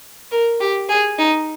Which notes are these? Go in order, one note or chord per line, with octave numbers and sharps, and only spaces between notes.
A#4
G4
G#4
D#4